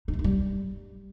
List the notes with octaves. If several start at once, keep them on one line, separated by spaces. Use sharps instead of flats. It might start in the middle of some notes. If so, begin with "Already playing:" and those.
D#4
A3
D#4
G3